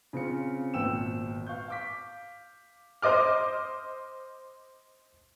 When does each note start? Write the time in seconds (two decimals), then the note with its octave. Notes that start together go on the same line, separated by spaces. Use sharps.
0.13 C#3 C4 F4 C#7
0.74 G#1 A#2 B3 G5 E6 E7
1.46 F5 C#6 G6
1.68 F5 D6 B6
3.02 C5 D#5 D6 F6